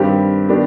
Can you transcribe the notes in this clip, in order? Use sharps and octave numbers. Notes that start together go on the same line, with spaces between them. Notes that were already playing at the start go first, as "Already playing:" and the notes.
Already playing: G2 D#3 G3 C4 G4
D#3 B3 D4 G4